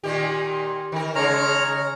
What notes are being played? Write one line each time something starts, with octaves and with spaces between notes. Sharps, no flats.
A#2 D#3 G4
D#3 A#4
C#3 G#3 C#5 A#5 F6